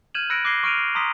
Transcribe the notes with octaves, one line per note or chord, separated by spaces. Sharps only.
F6 G6 G#6 D#7 E7 F#7
B5 E6 F#6 A#6 C#7 D7
D6 F#6 G#6 A#6 C7 G7
C#6 F6 D7 D#7 F7
C7
A#5 C6 D#6 B6